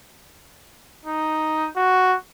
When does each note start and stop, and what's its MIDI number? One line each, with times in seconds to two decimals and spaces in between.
1.05 1.69 63
1.76 2.15 66